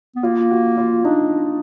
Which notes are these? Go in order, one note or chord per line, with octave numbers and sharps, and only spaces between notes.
B3
A#3 F4
F#4
F4
D4 D#4